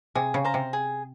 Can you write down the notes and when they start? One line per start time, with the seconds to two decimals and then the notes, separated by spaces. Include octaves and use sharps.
0.15 C3 G#4
0.34 C#3
0.44 C5 F5 A#5
0.54 C3
0.73 G#4